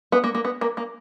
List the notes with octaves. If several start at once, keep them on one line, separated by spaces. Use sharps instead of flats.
B3
A#3
A#3
B3
A#3
A#3